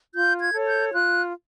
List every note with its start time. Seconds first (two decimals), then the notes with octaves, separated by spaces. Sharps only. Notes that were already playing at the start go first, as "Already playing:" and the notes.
0.14 F4 G6
0.40 G#6
0.53 A4 C#5
0.67 G6
0.93 F4 F#6